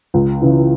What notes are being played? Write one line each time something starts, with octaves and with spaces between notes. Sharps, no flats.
C#2
C#3 E3